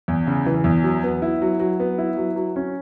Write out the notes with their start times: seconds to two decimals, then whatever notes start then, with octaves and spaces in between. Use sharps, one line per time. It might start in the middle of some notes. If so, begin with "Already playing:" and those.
0.08 E2
0.27 C#3
0.46 E3
0.64 E2
0.83 F#3
1.04 B3
1.22 E4
1.42 F#3
1.60 F#3
1.80 B3
1.98 E4
2.17 F#3
2.36 F#3
2.56 C#4